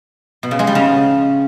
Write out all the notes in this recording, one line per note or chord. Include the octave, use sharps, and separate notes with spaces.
B2
C#3
G#3
G3
C#3